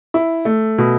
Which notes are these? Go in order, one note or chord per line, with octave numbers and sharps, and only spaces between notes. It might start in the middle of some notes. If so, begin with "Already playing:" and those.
E4
A3
B2